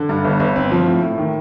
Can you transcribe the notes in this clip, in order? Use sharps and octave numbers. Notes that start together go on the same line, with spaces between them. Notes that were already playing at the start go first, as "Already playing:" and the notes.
Already playing: D3
G2
G1
G1
C4
F3
A2
A2
D#3